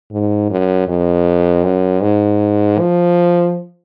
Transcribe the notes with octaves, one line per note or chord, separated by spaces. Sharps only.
G#2
F#2
F2
F#2
G#2
F3